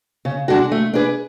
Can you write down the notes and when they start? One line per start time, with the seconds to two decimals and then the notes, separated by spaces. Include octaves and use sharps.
0.25 C#3
0.48 G#3 D4 F#4 A4
0.71 A3
0.94 D4 G#4 B4